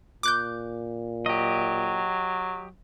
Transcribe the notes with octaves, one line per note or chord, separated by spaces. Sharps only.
A#2 D6 F#6 G6
F#3 G4 D#5